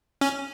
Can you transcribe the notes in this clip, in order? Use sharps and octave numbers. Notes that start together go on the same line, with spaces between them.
C#4